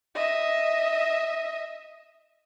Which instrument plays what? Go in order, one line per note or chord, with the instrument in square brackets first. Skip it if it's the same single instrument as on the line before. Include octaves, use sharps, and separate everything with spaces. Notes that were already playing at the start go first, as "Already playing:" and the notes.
[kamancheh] D#5 E5